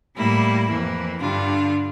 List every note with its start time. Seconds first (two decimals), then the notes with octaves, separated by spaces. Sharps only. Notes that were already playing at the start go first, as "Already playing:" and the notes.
0.17 A2 G3 A#3 E4
0.68 F2 E3 A#3
1.20 G2 D3 G3 D4 F4